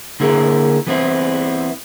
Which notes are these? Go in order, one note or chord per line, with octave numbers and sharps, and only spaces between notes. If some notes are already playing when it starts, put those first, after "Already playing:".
D3 A#3 E4 G#4 A#4
E3 B3 C4 E4